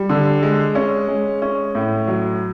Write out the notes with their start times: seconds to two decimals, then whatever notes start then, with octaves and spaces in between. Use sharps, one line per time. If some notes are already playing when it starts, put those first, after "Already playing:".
Already playing: G3
0.09 D3
0.43 G#3
0.75 C#4
1.08 G#3
1.42 C#4
1.75 A2
2.07 F#3